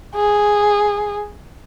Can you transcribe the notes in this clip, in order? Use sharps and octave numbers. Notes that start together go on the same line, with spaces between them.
G#4